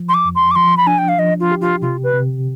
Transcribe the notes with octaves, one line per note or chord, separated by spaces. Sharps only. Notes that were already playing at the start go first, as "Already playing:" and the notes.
Already playing: F3
C6
D6
F2
C6
D6
F3 C6
B5
D4 G#5
G5
F5
F3 D#5
F4
G4
F4
C3 F4
B4
C3